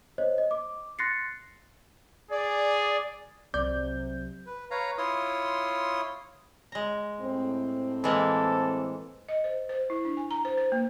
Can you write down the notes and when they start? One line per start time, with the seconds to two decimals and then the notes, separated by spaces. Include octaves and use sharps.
0.18 C5 C#5 D#5
0.38 D#5
0.51 D6
0.99 C6 F#6 A6 A#6 C7 C#7
2.31 G#4 D5
3.54 C2 C3 F#3 D5 G6
4.46 B4
4.71 B4 C#5 F5 A#5
4.98 E4 F4 C#5 C6 D#6
6.72 G#3 A#5
7.20 A2 C4
8.04 E3 G#3 A#3 A4
9.29 D#5
9.44 C5
9.69 C5
9.90 E4
10.05 D4
10.17 G#5
10.31 A#5
10.45 C5
10.58 C5
10.72 A#3